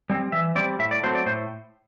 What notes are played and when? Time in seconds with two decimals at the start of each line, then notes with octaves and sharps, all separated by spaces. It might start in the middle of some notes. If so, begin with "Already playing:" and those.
0.10 G3 C4
0.32 E3 E5
0.55 G3 C4 D5
0.79 A2 E5
0.91 D5
1.03 F#3 A3 C4 C5
1.15 D5
1.26 A2 C5